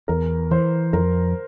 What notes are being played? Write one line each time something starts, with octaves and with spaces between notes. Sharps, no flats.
E2 A#4
E3 C5
F2 A#4